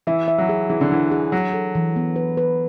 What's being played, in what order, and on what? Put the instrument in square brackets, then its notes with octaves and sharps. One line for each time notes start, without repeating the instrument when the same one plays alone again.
[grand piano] E3 [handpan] E5
[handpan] E5
[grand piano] F#3
[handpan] G#4
[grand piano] E3 [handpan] G#4
[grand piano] D3
[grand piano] E3 [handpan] D4
[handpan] G#4
[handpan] E3 [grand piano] F#3
[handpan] A4
E3
B3
B4
B4